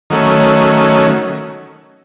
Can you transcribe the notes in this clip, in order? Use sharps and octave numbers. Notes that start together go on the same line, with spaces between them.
D#3 F#3 A3 C#4